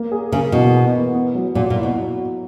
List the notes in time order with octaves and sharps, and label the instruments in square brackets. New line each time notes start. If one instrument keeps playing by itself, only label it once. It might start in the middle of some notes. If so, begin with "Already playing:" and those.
Already playing: [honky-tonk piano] A#3
G#4
[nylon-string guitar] C#3 [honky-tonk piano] A#3
[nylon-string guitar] B2 [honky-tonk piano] E3
[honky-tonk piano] B3
E3
B3
F#3
[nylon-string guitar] A#2 [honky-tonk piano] F#3
[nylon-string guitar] A#2
[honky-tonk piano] E4
[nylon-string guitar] B2